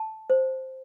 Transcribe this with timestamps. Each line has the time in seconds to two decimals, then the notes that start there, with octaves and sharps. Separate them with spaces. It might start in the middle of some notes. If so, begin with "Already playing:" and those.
Already playing: A5
0.30 C5